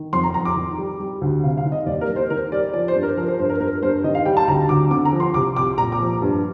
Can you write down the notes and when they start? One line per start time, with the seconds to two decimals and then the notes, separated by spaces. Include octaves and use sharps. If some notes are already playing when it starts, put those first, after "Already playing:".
Already playing: D#3
0.13 F2 C6
0.24 A#5
0.34 F2 A#5
0.45 D6
0.56 D#3
0.78 G3
1.00 G3
1.21 D2
1.43 C3 F5
1.58 F5
1.66 D#3
1.72 D#5
1.86 D#2 D5
2.01 A#4
2.08 D#2
2.16 C5
2.30 D#3 A#4
2.52 G3 D5
2.74 F3 D5
2.88 C5
2.95 G2
3.03 A#4
3.17 F3 A#4
3.28 C5
3.39 G2 C5
3.50 A#4
3.60 G2 A#4
3.82 G2 C5
4.04 D#3 D#5
4.15 F5
4.25 G3 G5
4.37 A5
4.48 D2 A#5
4.69 D2 D6
4.91 D3 D6
5.05 A#5
5.13 F3
5.20 C6
5.34 C2 D6
5.56 C2 D6
5.78 A#2 A#5
5.92 D6
6.00 F3
6.22 G2